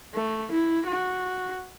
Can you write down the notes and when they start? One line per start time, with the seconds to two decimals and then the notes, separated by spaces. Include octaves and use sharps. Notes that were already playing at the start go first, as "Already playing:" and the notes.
0.14 A3
0.51 E4
0.87 F#4